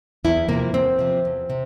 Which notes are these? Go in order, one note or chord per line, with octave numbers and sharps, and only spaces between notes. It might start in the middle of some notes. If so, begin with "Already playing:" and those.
E2 E4
C3 F3 A#3
E2 C4
C3 F3
E2
C3